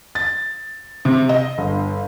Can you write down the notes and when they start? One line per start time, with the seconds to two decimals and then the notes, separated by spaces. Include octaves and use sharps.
0.15 A6
1.05 C3
1.29 D#5
1.58 G1